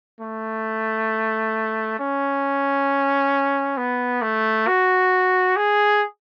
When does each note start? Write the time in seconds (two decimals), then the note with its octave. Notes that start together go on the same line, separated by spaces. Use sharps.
0.21 A3
1.99 C#4
3.77 B3
4.22 A3
4.68 F#4
5.56 G#4